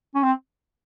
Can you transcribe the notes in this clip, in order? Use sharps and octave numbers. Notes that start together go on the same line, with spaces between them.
C#4
C4